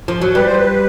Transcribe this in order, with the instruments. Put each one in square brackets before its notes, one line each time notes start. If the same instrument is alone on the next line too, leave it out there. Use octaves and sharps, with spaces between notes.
[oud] F3
F#3
[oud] G3 [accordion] B4
[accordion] C5
B4